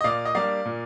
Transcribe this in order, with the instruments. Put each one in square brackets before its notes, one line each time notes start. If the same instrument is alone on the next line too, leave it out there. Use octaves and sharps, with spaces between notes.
[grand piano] D#5
A#2 D5 F5
D#5
G3 A#3 D4 D5 F5
A#2